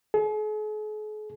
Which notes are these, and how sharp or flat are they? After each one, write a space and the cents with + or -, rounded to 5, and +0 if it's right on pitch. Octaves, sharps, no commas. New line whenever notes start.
G#4 +45